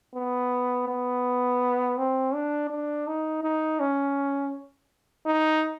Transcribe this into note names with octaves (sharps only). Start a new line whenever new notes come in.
B3
B3
C4
D4
D4
D#4
D#4
C#4
D#4